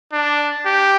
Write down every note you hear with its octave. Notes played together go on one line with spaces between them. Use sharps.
D4
G4